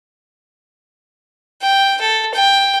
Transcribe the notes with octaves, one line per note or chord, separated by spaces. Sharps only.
G5
A4
G5